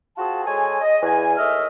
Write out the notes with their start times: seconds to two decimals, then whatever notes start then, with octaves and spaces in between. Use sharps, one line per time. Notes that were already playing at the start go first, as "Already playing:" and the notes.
0.18 C4 F4 F#4 G#4 A5
0.46 G#3 A4 C#5 G#5
0.81 D#5
1.02 E2 G#5
1.38 D#2 A3 D#5 E5 E6 F6